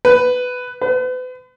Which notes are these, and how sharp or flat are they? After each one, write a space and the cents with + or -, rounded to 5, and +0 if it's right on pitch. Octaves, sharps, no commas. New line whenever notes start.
B4 +10
B4 +40